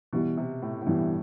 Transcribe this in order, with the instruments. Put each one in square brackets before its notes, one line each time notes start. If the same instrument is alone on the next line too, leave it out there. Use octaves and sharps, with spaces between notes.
[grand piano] B2 [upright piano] E3 G3 B3 E4
[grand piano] C3
A2
A2
[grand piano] G2 [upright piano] E3 G3 B3 E4